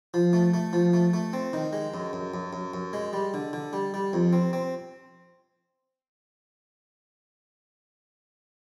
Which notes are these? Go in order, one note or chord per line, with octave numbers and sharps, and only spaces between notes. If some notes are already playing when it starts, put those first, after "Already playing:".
F3
A3
A3
F3
A3
A3
C4
D#3
G#3
F#2
F#2
F#2
F#2
F#2
G#3
G3
D3
D3
G3
G3
F2
C4
C4